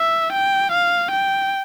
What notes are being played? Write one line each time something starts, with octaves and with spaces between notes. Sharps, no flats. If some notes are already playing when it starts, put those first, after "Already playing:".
Already playing: E5
G5
F5
G5